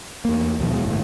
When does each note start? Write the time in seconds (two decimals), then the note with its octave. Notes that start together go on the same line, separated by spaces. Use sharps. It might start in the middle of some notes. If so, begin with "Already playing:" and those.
0.25 E2 A#3
0.60 D#2 B2 F3
0.72 B2 G#3
0.86 G1 A2